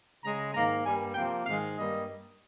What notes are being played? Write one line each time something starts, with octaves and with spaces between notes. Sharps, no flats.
C#3 G#3 A#5
G#2 D#3 A#3 A#5
G2 G3 A#3 G#5
C3 F3 A#3 G5
G#2 D#3 G#3 F5
G2 G3 A#3 D#5